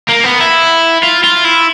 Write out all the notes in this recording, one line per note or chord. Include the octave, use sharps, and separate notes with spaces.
A#3
B3
E4
F4
F4
E4